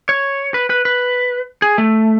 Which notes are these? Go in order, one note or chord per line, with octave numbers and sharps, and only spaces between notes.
C#5
B4
B4
B4
G#4
A3